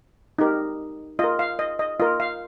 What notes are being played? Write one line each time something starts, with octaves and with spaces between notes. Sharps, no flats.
D#4 G4 A#4
F4 A#4 D#5
F5
D#5
D#5
F4 A#4 D#5
F5